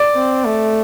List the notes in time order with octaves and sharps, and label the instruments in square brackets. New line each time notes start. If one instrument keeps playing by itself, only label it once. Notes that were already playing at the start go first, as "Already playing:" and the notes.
Already playing: [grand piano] D5
[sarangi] C4
A3